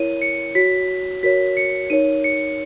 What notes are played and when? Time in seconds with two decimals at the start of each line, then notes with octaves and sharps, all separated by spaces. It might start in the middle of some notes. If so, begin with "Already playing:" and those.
Already playing: E4 A#4 C#5 D#7
0.22 C#7
0.55 F#4 C#5 B6
1.23 F#4 A#4 C#5 B6
1.57 C#7
1.90 D#4 A#4 C#5 D#7
2.24 C#7